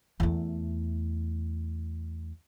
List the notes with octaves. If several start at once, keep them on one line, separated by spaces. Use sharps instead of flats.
E2 A3